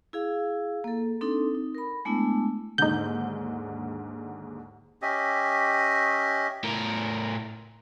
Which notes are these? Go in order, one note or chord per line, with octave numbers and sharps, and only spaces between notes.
E4 G#4 F5
A#3 A4
C4 D4 D#4 A4
D#4
A#4 B5
G#3 A3 B3 D4 E4
D#2 G#2 D3 D#4 G6
C#4 G4 D#5 E5
A2 A#4